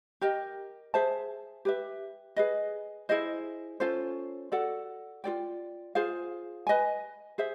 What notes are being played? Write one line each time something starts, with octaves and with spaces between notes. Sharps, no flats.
G4 A#4 D#5
G#4 C5 E5 A5
G4 B4 E5
G#4 B4 D#5
E4 G#4 C5 D#5
C#4 F4 A4 C5
F#4 A4 D5 F#5
F4 A4 D5 G5
F4 G#4 C5 F5
B4 D#5 G#5
G#4 C5 E5